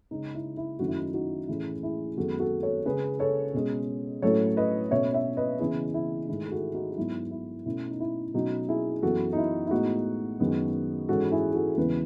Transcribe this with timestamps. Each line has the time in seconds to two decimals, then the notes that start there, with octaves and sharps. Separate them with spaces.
0.11 C#3 G#3 C#4 D#4
0.35 E4
0.57 E4
0.79 F#2 D#3 A3 C#4 F#4
0.88 E4
0.96 D#4 F#4
1.14 D#4 F#4
1.48 A2 E3 A3 C#4 E4 G#4
1.83 E4 G#4
2.17 F#2 D#3 G#3 B3 F#4 A4
2.39 F#4 A4
2.62 A4 C#5
2.85 C#3 G#3 C#4 G#4 B4
3.19 A4 C#5
3.54 B2 G#3 C#4
4.22 A2 F#3 A3 C#4 A4 C#5
4.57 B4 D#5
4.91 B2 A3 C#4 C#5 E5
5.14 C#5 E5
5.37 B4 D#5
5.59 C#3 E3 B3 E4 G#4
5.94 E4
6.28 G#2 D#3 A3 E4 G#4
6.47 G#4
6.52 F#4 A4
6.74 D#4 F#4
6.92 F#4
6.97 G#2 F#3 B3 E4
7.31 E4
7.66 B2 A3 C#4 E4
7.91 D#4
8.00 E4
8.34 B2 F#3 A3 C#4 D#4 F#4
8.69 E4 G#4
9.02 F#2 E3 B3 F#4 A4
9.33 D#4
9.37 E4
9.67 E4
9.71 A2 G#3 B3 D#4 F#4
10.40 F#2 D#3 G#3 B3
11.09 G#2 E3 G#3 C#4 F#4 A4
11.32 E4 G#4
11.54 F#4 A4
11.77 E2 C#3 E3 G#3 B3 G#4 B4